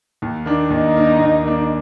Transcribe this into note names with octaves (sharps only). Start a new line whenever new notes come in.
D#2
D#3 A#3 D4
D#2 D#4
D#3 A#3 D4
D#2
D#3 A#3 D4